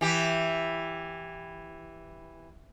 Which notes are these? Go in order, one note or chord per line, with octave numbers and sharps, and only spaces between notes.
E3 G4